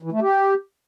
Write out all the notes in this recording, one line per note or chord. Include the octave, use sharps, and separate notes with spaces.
E3
A3
G4